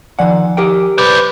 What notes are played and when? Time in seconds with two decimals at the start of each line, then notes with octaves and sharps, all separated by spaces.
0.19 D#3 F3 D5 F#5 G#5
0.57 G4 A#4 G5
0.98 B4 C5 D5